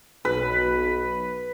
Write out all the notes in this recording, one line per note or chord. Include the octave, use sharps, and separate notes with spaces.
B1 B4